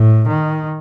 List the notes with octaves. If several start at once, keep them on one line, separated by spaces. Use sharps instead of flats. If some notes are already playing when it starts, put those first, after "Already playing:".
Already playing: A2
D#3